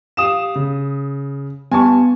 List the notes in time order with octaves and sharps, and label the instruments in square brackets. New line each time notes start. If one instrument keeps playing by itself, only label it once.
[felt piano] G4 F5 [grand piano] D#6 E7
[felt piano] C#3
[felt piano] G2 [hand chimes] B3 [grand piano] G#5 A5 C#6